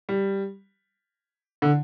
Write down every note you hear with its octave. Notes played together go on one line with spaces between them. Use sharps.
G3
D3